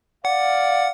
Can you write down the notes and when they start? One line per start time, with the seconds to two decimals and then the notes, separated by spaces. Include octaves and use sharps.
0.25 D5 F5 F#5